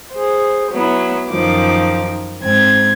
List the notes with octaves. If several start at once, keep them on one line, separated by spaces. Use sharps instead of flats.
G#4 C5
F#3 B3 E4
F#2 D#3 F3 D6
G#2 C4 G#6